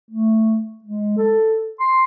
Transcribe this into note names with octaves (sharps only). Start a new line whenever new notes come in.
A3
G#3
A4
C6